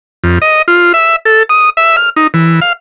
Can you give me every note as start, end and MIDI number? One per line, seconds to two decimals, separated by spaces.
0.24 0.38 41
0.42 0.62 75
0.68 0.93 65
0.94 1.16 76
1.25 1.43 69
1.49 1.70 87
1.77 1.96 76
1.97 2.10 89
2.16 2.27 63
2.34 2.60 52
2.61 2.73 77